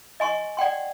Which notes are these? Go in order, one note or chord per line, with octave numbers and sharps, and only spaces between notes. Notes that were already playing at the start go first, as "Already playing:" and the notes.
D#5 G#5 C6 C#6
D5 F#5 G5 C6